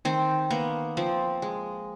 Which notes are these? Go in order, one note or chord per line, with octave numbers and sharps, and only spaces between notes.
D#3 C4
A#3 B3
F3 C4
G#3